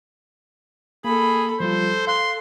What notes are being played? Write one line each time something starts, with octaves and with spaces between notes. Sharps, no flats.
A#3 G#4 A4 B5
F3 G3 F4 A4 C5
F5 C6 F#6